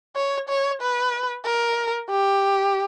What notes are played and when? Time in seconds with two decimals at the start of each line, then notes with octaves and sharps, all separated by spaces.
0.15 C#5
0.49 C#5
0.81 B4
1.46 A#4
2.10 G4